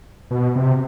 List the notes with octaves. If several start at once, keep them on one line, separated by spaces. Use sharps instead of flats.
B2
C3